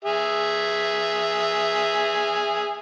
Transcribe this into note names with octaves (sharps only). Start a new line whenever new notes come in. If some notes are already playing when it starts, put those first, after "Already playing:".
G#4 E5